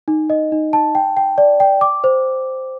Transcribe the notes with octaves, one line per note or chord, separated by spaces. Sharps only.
D#4
D#5
D#4
A5
G5
G5
D5
G5
D6
C5